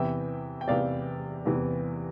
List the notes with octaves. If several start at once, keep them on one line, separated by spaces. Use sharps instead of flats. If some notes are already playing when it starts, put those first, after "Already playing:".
Already playing: E2 C3 E3 E5 G5
G5
E2 C3 E3 D5 F5
E2 C3 E3